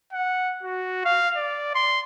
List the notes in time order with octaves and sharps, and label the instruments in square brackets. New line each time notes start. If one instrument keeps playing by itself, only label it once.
[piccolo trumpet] F#5
F#4
F5
D5
C6